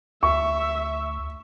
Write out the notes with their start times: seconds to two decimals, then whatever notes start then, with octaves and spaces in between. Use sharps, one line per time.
0.23 D2 E5 C#6